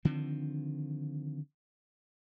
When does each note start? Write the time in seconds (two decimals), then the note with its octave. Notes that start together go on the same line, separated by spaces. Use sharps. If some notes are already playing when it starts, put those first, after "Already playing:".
0.05 D3 D#3 F3 C4